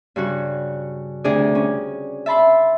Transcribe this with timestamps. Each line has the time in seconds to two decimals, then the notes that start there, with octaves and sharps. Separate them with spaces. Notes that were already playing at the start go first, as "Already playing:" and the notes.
0.16 G2 C#3 F#4
1.24 D2 C3 D4 G#4 D5
1.55 C#4
2.26 E5 A5 B5 C6